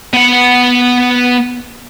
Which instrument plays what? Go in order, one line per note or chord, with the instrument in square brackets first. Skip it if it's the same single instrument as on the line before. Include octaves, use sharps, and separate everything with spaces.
[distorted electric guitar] B3 F#5